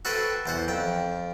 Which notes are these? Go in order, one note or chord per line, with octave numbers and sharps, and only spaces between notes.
F#4 A4 B4 C5 G5
E2 C5 F#5
F2 G5